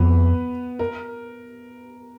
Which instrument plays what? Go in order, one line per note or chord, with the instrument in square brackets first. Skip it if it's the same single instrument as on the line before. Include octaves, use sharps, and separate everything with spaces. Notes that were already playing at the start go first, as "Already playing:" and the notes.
Already playing: [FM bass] F2 [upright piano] B3 B4
[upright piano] A#4